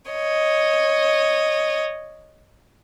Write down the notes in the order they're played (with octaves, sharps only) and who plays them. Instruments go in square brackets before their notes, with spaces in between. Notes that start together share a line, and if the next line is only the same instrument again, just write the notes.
[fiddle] C#5 D#5